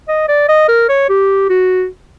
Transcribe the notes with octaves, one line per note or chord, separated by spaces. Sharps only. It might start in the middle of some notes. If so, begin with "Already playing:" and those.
D#5
D5
D#5
A#4
C#5
G4
F#4